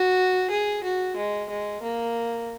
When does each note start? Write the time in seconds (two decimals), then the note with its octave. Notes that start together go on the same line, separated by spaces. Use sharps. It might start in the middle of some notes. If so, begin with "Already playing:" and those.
Already playing: F#4
0.50 G#4
0.83 F#4
1.17 G#3
1.49 G#3
1.82 A#3